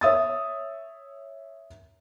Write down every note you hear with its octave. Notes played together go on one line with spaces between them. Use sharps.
C#5 E5 D#6 A6